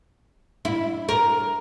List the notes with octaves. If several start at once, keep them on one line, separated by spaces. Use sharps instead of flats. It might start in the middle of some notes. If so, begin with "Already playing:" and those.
E4
A#4